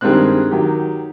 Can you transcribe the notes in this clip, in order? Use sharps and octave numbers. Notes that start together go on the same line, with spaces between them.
G2 D#3 G3 G#3 C4 F#6
D#3 F#3 G4